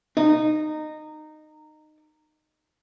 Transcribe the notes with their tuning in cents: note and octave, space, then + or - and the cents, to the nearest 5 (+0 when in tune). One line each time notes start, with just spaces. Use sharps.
D#4 -20